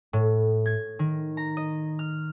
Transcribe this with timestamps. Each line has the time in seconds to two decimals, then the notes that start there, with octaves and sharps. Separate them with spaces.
0.13 A2
0.66 G#6
0.99 D#3
1.37 A#5
1.57 D#5
1.99 F6